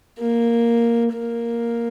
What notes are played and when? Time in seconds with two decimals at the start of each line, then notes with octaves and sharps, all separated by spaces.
0.19 A#3
1.13 A#3